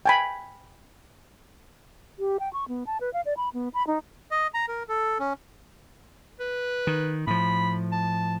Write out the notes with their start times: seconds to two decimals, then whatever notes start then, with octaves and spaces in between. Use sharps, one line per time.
0.06 G5 G#5 B5
2.19 G4
2.40 G5
2.53 C#6
2.68 B3
2.87 A5
3.01 B4
3.13 F5
3.26 D5
3.37 B5
3.54 B3
3.74 B5
3.87 D#4
4.31 D#5
4.54 A#5
4.68 A#4
4.89 A4
5.19 C#4
6.40 B4
6.87 D#3
7.27 A2 F3 B5
7.92 A5